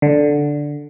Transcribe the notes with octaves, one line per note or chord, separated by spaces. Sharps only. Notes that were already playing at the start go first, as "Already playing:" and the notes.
D3